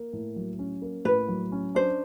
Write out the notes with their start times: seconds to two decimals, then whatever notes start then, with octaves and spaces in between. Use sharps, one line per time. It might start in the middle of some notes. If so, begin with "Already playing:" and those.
Already playing: A#3
0.13 A2
0.36 F#3
0.59 C#4
0.82 A#3
1.05 A2 B4
1.28 F#3
1.52 C#4
1.75 D4 C5